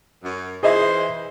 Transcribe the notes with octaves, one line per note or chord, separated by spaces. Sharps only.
F#2
E3 G#4 C5 D#5 E5